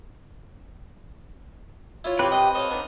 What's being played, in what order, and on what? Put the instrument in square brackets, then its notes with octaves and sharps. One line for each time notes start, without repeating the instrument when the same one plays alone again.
[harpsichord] E4 F4 C#5
[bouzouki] C3 G4 [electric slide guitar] C4 B4
[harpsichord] D#5
[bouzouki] A4 C#5 [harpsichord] D#5 F5
[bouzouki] B3 D4 D#4